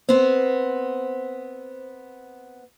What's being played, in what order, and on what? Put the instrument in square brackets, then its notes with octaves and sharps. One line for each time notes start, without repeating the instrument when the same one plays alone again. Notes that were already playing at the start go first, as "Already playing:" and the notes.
[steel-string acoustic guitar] B3 C4 [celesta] C5